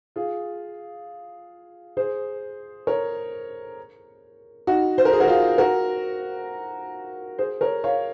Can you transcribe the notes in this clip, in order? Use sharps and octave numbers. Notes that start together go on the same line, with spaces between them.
F4 G#4
G#4 C5
A#4 C#5
D#4 F#4
C5
A#4
G#4
F#4 A#4
F4 G#4
F#4 A#4
G#4 C5
A#4 C#5
C#5 F5